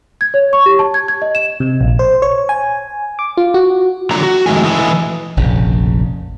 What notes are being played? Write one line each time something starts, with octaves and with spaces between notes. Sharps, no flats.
G#6
C#5
C#6
G4
A5
G#6
G#6
D#5
E7
C3
A#1
C5
C#5
G#5
D6
F4
F#4
D3 F#3 F4 A#5
F#4
F2 A2 D#3 G#3 A3 G#5
E3 A3 E4 D#5 G#5
F1 A#1 C#3